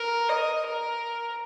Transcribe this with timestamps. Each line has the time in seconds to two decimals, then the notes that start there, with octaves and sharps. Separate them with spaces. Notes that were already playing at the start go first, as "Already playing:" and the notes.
Already playing: A#4
0.29 D#5
0.66 A#4